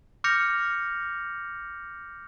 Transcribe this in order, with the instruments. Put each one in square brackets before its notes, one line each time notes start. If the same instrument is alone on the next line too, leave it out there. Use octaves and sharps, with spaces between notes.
[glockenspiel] D6 F6 G6 A#6 C#7 F7